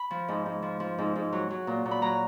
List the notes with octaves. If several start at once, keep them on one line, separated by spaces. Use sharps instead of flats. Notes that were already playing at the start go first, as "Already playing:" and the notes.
Already playing: B5
F3
G#2
G#2
F3
F3
G#2
G#2
F#3
F#3
A#2
A#2
B5
F#3 A#5